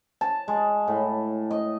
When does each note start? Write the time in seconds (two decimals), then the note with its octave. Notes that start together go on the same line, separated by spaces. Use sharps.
0.21 A5
0.48 G#3
0.88 A2
1.51 D#5